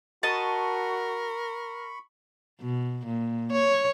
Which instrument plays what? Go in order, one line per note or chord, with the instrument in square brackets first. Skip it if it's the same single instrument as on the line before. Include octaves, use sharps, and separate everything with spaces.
[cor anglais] F#4 [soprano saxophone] A#4 [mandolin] D#5 A5 [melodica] B5 C#6
[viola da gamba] B2
A#2
C#5